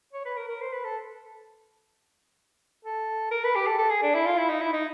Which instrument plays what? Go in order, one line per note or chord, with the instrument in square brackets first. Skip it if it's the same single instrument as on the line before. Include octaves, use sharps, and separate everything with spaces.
[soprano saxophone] C#5
B4
A#4
A#4
C5
B4
A4
A4
A#4
B4
G4
A4
A4
G#4
D4
E4
F4
E4
D#4
E4
D#4